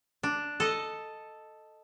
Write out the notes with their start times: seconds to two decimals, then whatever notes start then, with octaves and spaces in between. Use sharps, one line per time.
0.23 D4
0.60 A4 D#5